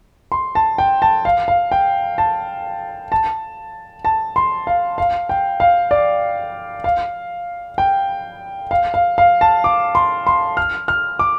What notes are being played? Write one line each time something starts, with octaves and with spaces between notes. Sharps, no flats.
C6
A5
G5
A5
F5
F5
G5
A5
A5
A5
C6
F5
F5
G5
F5
D5
F5
G5
F5
F5
F5
A5
D6
C6
C6
F6
F6
D6